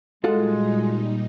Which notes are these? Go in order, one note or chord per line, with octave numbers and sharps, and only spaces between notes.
A#2 G3 G#3 D#4 F4 F#4 A4